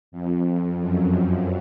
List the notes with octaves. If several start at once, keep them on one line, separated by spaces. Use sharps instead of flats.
F2
F#2
F#2